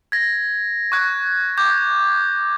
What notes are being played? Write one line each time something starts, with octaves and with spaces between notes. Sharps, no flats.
G#6 A#6
C#6 F#6 G#6
D6 G6